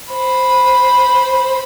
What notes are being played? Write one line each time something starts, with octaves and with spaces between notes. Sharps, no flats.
C5 B5